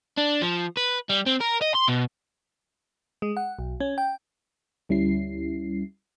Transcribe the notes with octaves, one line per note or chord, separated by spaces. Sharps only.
D4
F3
B4
G3
C4
A#4
D#5
C6
B2
G#3
F#5
B1
C#4
G5
D2 G3 C#4 E4 C7